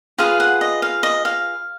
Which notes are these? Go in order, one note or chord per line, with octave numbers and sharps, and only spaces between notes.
F4 G#4 B4 F5
F#5
D#5
F5
D#5
F5